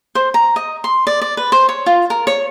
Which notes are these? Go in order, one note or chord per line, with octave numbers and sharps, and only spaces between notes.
C5
A#5
D#5
C6
D5
D5
B4
C5
C#5
F4
A#4
C#5